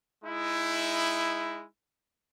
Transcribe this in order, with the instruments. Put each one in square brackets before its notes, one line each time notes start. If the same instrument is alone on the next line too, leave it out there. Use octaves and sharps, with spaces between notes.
[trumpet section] G#3 D#4 E4